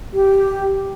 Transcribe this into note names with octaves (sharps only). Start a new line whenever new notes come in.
G4